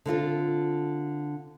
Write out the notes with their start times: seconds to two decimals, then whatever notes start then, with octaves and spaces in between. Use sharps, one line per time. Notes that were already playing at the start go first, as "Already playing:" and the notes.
0.06 D3 C4 F4 A4